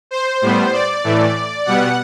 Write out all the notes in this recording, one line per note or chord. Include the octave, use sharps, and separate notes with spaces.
C5
A2 G3 B3
D5
A2 E3 A3
B2 G3 B3 F#5